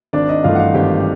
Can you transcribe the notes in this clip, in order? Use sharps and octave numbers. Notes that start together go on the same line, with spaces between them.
G#1 D4 D5
D#4 D#5
G2 E3 A3 F4 F5
F#5
F4 F5
G#1 G4 G5